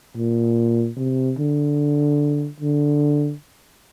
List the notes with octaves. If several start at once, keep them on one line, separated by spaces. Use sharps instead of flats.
A#2
C3
D3
D3